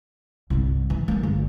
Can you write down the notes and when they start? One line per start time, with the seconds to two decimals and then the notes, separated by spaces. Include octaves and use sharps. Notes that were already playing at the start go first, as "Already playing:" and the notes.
0.50 C2 G2
0.90 E3
1.08 E3 A#3
1.23 G1